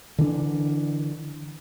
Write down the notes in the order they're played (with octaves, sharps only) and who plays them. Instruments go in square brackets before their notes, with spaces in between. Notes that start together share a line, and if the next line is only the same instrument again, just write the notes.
[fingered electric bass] D3 E3 D4